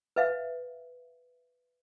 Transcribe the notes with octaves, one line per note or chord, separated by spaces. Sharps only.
B4 E5 F5